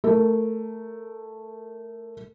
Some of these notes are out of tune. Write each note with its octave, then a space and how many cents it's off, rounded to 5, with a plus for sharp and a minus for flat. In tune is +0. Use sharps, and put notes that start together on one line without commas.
A3 +0 A#4 -15